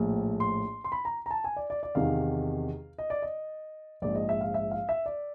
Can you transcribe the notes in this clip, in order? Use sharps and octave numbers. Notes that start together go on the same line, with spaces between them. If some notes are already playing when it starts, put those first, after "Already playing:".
Already playing: A#1 A2 F3
C6
C6
B5
A#5
A#5
A5
G#5
D5
D5
D5
E2 C3 D#3 F5
D#5
D5
D#5
A#1 G#2 F3 D5
D#5
E5
F5
E5
F5
E5
D5